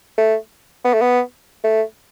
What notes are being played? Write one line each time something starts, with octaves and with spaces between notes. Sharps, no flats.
A3
B3
A3
B3
A3